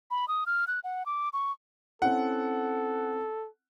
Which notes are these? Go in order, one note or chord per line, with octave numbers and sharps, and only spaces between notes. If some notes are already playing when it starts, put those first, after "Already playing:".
B5
D#6
F6
F#6
F#5
D6
C#6
C4 C#4 E4 A4 F#5